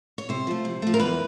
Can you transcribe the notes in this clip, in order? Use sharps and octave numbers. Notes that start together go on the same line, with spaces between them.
C#5
C3 C5
F3 A3
C3
F3 A3
A#4
E2 B4